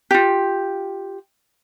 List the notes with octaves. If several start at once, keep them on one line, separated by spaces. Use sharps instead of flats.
F4 G4